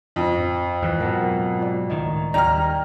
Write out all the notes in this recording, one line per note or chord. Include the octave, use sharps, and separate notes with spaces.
F2
G#2 E3 F6 F#6 A#6
G#2 B2 F#3 A#4 F#5 A5
F4 D5
C#2 A2 D#3 D#5 A#5
D#2 G3 D#4 D5 G5 A#5 F6